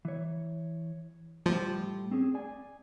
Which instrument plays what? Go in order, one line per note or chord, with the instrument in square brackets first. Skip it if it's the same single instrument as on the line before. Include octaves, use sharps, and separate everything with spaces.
[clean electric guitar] E3 C#5
[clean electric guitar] A2 G3 A3 [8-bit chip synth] F3
[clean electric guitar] C4 C#4 G#4
D5 G#5